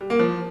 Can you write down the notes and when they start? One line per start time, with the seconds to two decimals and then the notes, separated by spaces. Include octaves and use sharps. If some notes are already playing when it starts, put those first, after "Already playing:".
0.01 G3
0.10 A#3
0.19 F3